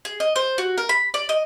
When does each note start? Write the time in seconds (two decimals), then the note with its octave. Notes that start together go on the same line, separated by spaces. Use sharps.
0.05 G#4
0.20 D#5
0.36 C5
0.58 F#4
0.78 A#4
0.89 B5
1.14 D5
1.29 D#5